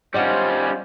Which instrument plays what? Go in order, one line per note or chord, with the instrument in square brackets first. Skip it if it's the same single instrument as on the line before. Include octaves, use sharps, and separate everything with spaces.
[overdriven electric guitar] G3 C#4 [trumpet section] F4 C5 [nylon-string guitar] D5 D#5 F#5